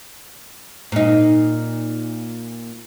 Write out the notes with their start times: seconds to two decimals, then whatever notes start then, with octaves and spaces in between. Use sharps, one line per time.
0.92 A#2 D#4